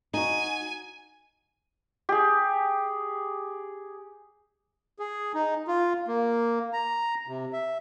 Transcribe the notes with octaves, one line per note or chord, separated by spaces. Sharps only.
D#4 F#4 G#5
G4 G#4
G#4
D#4
F4
A#3
A#5
C3
E5